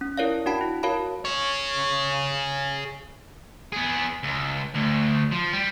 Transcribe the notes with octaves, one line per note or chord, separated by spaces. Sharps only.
C#4
E4 A#4 C#5 D5 F5
D4 F#4 F#5 A5 B5
E4
F#4 A#4 C#5 F5 A5 B5
G#4 C#5
B3 G#4
C#2
D2
F3
G3